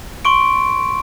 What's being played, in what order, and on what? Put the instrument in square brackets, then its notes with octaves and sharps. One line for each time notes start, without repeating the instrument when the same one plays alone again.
[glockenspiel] C6 C#6 D7